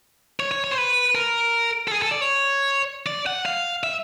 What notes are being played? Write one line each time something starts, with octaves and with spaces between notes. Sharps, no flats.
C#5
C#5
C#5
C5
B4
A#4
A4
G#4
A4
D5
C#5
D5
F#5
F5
E5